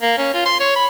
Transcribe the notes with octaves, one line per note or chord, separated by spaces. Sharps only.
A#3
C#4
F4
C6
C#5
B5